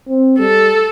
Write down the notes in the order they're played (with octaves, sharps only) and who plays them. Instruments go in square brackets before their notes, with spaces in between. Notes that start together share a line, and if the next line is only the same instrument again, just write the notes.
[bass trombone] C4
[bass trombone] G3 [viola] A4